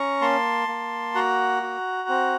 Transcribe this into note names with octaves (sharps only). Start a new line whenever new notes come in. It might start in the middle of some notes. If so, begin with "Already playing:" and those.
Already playing: C#4 A#5 C#6
A#3 A5 C6
A#3
F#4 F#5 A#5
F#4
C4